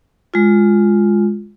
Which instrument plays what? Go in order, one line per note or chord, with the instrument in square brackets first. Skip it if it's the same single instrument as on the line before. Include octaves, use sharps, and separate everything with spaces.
[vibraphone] G#3 F4